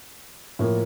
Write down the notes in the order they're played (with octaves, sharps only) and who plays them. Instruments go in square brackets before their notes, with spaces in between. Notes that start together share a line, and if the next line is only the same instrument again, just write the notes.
[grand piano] A2 F3 A#3